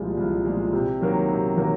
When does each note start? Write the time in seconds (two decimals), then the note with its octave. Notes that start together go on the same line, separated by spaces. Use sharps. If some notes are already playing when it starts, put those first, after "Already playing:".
Already playing: C2 A#2 F3 G#3
0.17 C2
0.45 A#2 F3 G#3
0.73 C3
1.01 D#3 F#3 A#3
1.28 C3
1.57 D#3 F#3 A#3